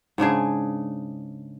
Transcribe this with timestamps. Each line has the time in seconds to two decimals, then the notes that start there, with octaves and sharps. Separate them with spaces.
0.18 G#2 C#3 D4 G#4